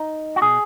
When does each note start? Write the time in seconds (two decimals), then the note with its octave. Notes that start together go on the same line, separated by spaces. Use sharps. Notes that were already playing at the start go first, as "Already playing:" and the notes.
Already playing: D#4
0.36 F#4
0.41 B2 G#4